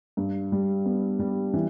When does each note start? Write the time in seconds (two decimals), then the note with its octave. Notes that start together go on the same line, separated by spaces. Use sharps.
0.17 G2
0.52 G3
0.86 B3
1.19 G3
1.54 E3